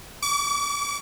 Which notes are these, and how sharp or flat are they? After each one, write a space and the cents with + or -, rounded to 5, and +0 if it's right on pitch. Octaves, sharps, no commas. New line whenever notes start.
D6 -40